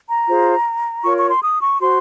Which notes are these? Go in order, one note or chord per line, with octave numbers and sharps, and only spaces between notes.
A#5
F4 G#4 C5
F4 A#4 C#5 C#6
C#6
C6
D#6
C#6
F#4 C5 C6